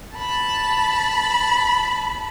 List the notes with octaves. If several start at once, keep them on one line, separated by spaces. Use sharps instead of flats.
A5 B5